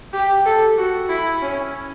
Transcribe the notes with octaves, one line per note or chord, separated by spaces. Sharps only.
G4
A4
F#4
E4
C#4